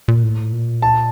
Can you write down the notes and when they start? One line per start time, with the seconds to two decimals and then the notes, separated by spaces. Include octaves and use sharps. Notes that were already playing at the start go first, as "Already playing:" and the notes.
0.08 A#2
0.23 A2
0.53 A#2
0.82 A5